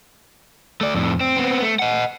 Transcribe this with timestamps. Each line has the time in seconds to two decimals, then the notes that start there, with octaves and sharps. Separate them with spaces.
0.81 A3 D5
0.95 F2 A2
1.21 C4
1.37 B3 C4
1.62 A3
1.79 D#5 F#5